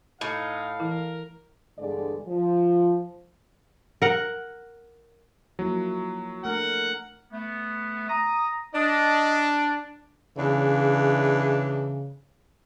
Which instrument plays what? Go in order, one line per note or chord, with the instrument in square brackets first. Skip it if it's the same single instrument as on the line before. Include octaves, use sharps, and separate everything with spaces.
[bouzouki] A2 [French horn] D#4 [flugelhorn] F5
[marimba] E3 E4 [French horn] A#4
[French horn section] E2 G2 D3 G#3 G#4 D5
F3
[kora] A#4 F#5
[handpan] F3 A#3 E4 [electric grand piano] F#3
[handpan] A3 D4 [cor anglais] A#4 [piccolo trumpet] F#5
[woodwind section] A3 B3
A#5 D#6
[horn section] D4 [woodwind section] D#5
[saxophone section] E2 E3 D4 [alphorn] C#3